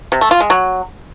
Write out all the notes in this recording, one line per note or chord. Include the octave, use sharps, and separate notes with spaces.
C3
A3
F4
G#3
F#3